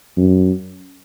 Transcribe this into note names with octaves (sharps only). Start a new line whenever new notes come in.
F#2